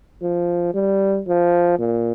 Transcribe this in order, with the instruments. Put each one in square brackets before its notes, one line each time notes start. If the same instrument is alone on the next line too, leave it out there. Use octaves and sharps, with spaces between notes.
[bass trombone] F3
G3
F3
A#2